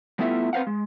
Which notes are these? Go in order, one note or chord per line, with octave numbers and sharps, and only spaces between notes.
G3 A3 B3 E4 F4 E5
C4 B4 C5 F5 F#5
G#3